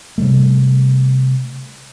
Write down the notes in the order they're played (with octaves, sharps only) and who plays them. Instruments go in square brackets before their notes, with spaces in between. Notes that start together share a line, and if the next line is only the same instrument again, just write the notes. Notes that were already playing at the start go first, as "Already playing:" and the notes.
[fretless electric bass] C3 G3 A3